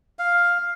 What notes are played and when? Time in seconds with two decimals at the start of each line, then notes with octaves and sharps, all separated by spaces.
0.19 F5